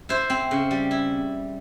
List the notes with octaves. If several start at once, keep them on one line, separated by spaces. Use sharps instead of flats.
E4 C5
C4
C#3
G3
E4